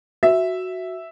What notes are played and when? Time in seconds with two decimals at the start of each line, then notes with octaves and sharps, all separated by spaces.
0.23 F#4 E5